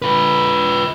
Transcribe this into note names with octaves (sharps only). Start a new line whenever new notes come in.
F4 B4